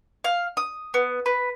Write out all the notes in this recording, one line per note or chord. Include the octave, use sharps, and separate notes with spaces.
F5
D#6
B3
B4